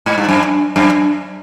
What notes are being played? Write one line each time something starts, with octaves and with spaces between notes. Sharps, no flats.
G#2
G2
F#2
F#2